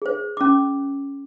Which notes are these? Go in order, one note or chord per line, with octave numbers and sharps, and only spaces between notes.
G#4 C5
C#4 D6